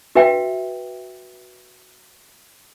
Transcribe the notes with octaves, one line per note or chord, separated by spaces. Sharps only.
F#4 B4 E5 F5 G5